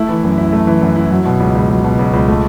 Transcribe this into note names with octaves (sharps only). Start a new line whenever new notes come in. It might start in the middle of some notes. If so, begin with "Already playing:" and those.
Already playing: A3 E4
E3
F#2
E4
A3
E3
F#2
E4
F#3
B2
C#2
C#2
F#3
B2
C#2
C#2
A3